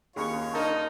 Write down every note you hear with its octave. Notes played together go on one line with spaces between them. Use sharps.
D#2 A#3 C#4 F4 G#4 C#5 C#6
D4 D#4 A#4 A5